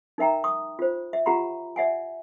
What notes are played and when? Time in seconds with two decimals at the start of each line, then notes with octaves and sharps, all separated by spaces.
0.18 D#4 A#4 E5 G5 A#5
0.44 C#6 D#6
0.79 F4 C5
1.13 E5
1.26 F4 G4 F#5 A#5 B5
1.76 D5 E5 F#5 G#5